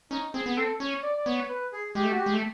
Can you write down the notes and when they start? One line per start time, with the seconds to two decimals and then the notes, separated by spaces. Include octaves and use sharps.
0.11 C#4 D#4
0.34 C4 G#4
0.46 B3
0.57 C4 A4
0.80 C#4 C#5
1.02 D5
1.17 D5
1.26 B3 C#5
1.49 B4
1.73 G#4
1.95 G#3 G4
2.03 A3
2.11 F#4
2.18 G4
2.26 G#3
2.33 A3